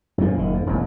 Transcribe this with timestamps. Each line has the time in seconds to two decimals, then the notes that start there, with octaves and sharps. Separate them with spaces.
0.18 F#2 A#2 F3
0.37 F#1 D#3
0.54 F2
0.66 E1 A1 F#2